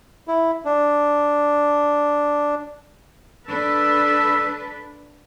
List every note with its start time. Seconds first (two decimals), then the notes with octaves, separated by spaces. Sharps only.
0.28 E4
0.65 D4
3.48 D4 A4 B4 E6